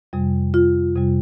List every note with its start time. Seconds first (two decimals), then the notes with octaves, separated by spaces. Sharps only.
0.13 F2 C3 G3
0.54 F4
0.96 F2 C3 G3